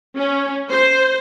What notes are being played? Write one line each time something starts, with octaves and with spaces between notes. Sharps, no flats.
C#4
C5